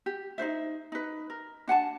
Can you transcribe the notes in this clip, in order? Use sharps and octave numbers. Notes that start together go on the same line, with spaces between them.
G4
D#4 F4 C5 E5
D#4 B4
A#4
D4 F#5 G#5 A5